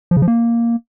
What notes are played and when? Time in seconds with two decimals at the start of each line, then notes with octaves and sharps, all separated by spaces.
0.11 F3
0.17 C#3
0.22 F3
0.28 A#3